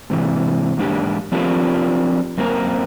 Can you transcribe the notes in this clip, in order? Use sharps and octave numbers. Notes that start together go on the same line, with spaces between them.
G#2 C3 E3
E2 G#2 A#3 D4 G4
F3 C4 D4 F4 G4 A#4
F#2 A#3 C4 F4 A#4